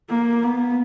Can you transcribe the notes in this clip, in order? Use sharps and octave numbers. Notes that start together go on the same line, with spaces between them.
A#3
B3